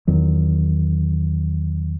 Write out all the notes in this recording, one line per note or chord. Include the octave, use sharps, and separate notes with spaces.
E2 D#3 F#3